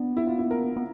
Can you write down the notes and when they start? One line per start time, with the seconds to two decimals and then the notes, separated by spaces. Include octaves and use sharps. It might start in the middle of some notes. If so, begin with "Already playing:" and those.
Already playing: B3 D4
0.17 E4
0.27 F4
0.38 E4
0.51 A#4
0.76 B3